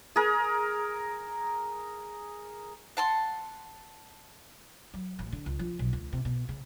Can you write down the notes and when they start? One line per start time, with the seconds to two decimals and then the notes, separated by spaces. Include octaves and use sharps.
0.16 G#4 A#4
2.97 F#5 A5 C6
4.94 F#3
5.19 A1
5.32 D3
5.46 C#2
5.59 F3
5.79 B1
5.93 D2
6.13 C3
6.25 B2
6.49 C#3